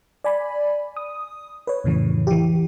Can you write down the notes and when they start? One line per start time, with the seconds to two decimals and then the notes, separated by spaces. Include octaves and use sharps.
0.24 D5 G#5 B5
0.97 D#6
1.67 B4 C#5
1.84 F2 A2 C#3 E3
2.27 E3 G4